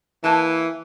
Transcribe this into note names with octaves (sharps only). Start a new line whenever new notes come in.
E3 A#3 B4 A5